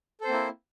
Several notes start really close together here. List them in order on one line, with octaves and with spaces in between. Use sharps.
A4 C5 C4 A#3 E4